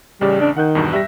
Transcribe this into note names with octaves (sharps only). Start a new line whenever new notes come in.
A1 C#3 G3 D5
D4
D#3 F#5 F#6 G6
E2 G2 B2
G3 E5 A#6